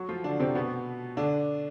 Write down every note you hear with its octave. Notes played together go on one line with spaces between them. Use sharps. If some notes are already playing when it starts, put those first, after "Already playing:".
Already playing: F#3 F#4
F3 F4
D3 D4
C3 C4
B2 B3
D3 D4